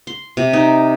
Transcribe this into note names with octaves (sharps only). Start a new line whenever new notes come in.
C6
C3
D#4